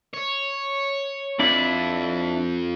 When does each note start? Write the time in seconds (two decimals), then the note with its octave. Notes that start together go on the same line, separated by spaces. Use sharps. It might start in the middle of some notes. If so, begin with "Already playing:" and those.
0.14 C#5
1.39 F2 D4 E4 D5